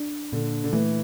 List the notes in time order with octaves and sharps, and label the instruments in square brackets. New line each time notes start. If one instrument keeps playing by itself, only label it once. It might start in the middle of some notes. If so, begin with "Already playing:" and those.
Already playing: [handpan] D4
[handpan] A#2 [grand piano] D3
[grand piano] D3
[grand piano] E3 [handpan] A3